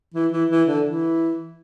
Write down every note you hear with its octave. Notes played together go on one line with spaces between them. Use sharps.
E3
E3
E3
D3
E3